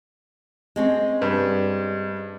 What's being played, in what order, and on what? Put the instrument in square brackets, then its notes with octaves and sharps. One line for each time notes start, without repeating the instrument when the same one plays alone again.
[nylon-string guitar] G#3 C4 C#4
[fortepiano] G2